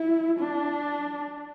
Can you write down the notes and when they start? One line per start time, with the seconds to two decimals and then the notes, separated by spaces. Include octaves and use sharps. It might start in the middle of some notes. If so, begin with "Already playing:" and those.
Already playing: E4
0.39 D4